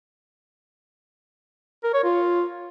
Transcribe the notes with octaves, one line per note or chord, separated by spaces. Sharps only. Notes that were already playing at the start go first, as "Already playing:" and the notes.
A#4
C#5
F4